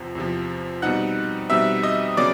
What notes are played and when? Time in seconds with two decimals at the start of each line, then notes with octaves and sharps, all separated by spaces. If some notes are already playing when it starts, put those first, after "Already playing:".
Already playing: E2 C3 F3
0.15 E2 C3 F3
0.82 B2 G3 C4 D#4 F#5 F#6
1.50 B2 G3 C4 D#4 E5 E6
1.83 D#5 D#6
2.17 C#3 F#3 B3 D5 D6